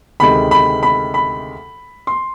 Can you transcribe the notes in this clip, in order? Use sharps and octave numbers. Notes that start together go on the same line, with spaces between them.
D2 C3 D#3 G#3 B5
B5
B5
B5
C6